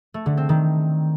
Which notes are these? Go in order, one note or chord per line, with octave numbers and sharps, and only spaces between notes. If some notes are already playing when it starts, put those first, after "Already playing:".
A3
D3
C4
D#3